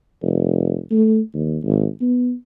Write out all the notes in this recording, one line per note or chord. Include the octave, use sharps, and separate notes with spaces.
F1
A3
D#2
G#1
B3